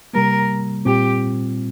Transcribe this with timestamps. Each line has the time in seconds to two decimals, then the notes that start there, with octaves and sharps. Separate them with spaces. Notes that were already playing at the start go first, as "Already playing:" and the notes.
0.13 C3 G3 A#3 A#4
0.85 A#2 G3 C4 F4 G4